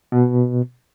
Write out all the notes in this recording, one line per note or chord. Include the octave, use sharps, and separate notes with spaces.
B2